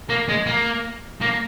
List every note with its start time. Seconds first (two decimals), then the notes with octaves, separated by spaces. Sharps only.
0.09 A#3
0.29 G#3
0.47 A#3
1.21 A#3